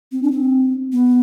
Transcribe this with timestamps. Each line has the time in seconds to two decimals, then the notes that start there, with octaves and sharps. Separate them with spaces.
0.12 C4
0.23 D4
0.32 C4
0.93 B3